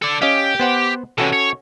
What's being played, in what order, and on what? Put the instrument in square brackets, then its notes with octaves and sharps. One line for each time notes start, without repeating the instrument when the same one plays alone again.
[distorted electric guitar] A4 D5
[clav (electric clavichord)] C#4 D#5 F5 [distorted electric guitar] G4
[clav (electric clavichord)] B3 C5 F#5
[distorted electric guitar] C3 E3 [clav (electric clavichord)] C#4 F#4 A4
[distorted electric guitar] C#5